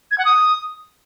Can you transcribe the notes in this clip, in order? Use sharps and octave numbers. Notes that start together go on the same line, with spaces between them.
G#6
F#5
D#6